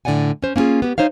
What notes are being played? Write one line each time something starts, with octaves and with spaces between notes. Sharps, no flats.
A2 D3 F4 D5 F#5 G#5
C#4 C5
A#3 C#4 D4 F4 G#4
B3 G4
D#4 C5 C#5 F5